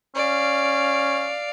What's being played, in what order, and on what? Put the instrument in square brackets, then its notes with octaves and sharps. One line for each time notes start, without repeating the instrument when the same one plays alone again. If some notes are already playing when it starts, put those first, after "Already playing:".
[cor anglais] C#4 [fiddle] D5 F5